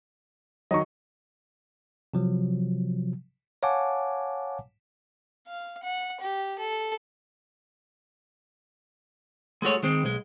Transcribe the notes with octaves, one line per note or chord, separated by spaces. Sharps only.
D#3 F#3 D#5 C#6
C3 F3 F#3
C#5 F5 F#5 G#5 A5 D6
F5
F#5
G4
A4
G#3 A3 F#4 C#5
D#3 G#3 C4
B1 G#3